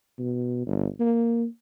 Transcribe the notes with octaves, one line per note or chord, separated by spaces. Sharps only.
B2
G1
A#3